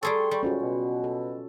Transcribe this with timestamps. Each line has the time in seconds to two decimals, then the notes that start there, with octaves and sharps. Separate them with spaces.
0.03 G3 G#4 A4 G5 C6 C#6
0.31 G3
0.43 G#2 C#4 F4 F#4
0.62 B2
1.04 A4